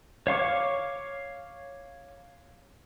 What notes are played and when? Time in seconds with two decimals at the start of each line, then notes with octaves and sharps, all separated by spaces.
0.27 C#5 F5 C#6 D6